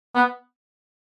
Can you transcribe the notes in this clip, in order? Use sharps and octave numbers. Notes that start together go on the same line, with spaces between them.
B3